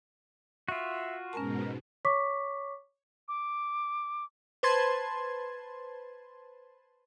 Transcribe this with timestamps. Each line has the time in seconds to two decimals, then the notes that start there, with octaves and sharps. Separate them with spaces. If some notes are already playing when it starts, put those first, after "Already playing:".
0.68 F4 F#4 E5
1.33 G#2 B2 C#4 A#4 G#5 A5
2.05 C#5 C#6 D6 B6
3.28 D6
4.63 B4 C5 A5 C6 G#6